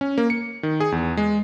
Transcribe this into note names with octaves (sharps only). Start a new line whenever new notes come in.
C#4
A#3
C#7
D#3
G#4
E2
G#3